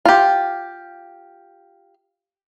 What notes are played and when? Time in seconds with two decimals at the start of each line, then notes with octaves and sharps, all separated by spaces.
0.05 F4 G4